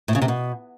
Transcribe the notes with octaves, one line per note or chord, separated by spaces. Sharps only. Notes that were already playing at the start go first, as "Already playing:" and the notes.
A2
C#3
C3
B2